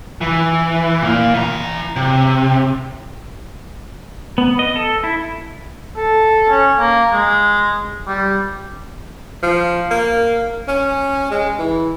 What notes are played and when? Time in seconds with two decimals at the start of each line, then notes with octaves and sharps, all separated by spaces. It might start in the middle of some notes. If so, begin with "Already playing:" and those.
0.21 E3
1.02 A#2 A#3
1.34 E3 A#5
1.96 C3
4.38 B3
4.59 D#5
4.76 A4
5.04 E4
5.96 A4
6.49 C#4
6.79 A#3
7.13 G#3
8.08 G3
9.43 F3
9.91 A#3
10.68 C#4
11.31 G#3
11.59 E3